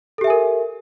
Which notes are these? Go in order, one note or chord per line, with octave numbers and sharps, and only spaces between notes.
G4 A4 A#4 E5 G#5